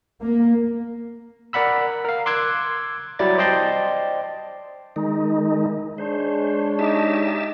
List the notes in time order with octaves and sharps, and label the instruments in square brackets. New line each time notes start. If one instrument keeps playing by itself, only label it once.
[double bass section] A#3
[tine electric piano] A#4 D5 F#5 B5 E6
A#4 F5
C6 D6 E6 F#6 G#6
F#3 G3 E4 D5 A6
C5 D5 D#5 G5 A5 C6
[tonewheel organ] D#3 G#3 D#4
[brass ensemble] G#3 D4 C#5 [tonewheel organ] C5
[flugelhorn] D#4 [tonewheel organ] G4 E5 A5